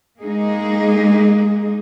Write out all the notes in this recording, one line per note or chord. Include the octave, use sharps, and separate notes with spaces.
G#3 A#3 D#4 G#4